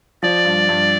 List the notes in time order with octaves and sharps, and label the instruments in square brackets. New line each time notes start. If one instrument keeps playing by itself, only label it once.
[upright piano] F3 [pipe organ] D5
[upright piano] G2
G2